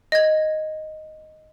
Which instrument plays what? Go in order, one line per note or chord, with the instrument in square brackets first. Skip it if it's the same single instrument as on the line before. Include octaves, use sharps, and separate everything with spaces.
[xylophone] D#5 G#6